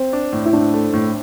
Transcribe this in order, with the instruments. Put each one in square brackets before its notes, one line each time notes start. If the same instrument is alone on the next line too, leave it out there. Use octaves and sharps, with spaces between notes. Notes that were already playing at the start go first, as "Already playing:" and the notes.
Already playing: [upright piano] C4
[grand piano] D4
A2
[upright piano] E4
[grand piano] A2 [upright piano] D4
[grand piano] A3
A2